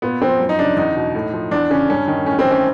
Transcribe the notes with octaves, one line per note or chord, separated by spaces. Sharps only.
A#2 B3
F3 C4
F#2
D#4
C#3 D4
E2 D#4
B2
A2
F3
E2 D4
C#3 C#4
G2 C#4
D#3
A2 C#4
C4
E3
C#4